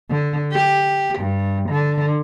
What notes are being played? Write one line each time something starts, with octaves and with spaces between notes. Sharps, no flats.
D3
G4
G2
D3